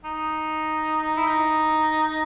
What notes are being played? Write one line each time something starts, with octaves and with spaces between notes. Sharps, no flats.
D#4
D#4
E4
D#4